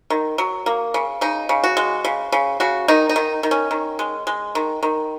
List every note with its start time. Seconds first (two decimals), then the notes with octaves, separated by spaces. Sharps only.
0.10 D#3
0.38 F#3
0.66 A#3
0.94 C#3
1.21 C#3 D#4
1.49 C#3
1.64 F#4
1.77 G#3
2.04 C#3
2.32 C#3
2.60 C#3 F#4
2.88 D#3 D#4
3.09 D#4
3.16 D#3
3.43 D#3
3.51 C#4
3.71 D#3
3.99 G#3
4.27 G#3
4.55 D#3
4.83 D#3